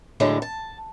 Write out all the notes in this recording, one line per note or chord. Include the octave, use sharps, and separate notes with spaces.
A2 D3 F#3 G#3
A5